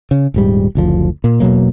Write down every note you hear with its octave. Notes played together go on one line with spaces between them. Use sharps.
C#3
D#1 G#2 G3
F#1 D2 F3
A#2
E1 B2 F#3 A#3